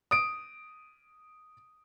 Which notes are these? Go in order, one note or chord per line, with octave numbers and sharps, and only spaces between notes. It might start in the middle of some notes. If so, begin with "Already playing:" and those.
D#6 D7